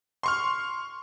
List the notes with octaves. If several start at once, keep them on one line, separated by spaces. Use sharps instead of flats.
C6 C#6 F6